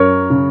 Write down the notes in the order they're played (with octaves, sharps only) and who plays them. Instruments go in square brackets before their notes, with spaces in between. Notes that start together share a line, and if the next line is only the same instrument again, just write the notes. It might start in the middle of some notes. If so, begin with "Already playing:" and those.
Already playing: [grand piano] F#2 A#4 C#5
C#3